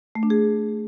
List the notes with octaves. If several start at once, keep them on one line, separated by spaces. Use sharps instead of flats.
A3
D4
G#4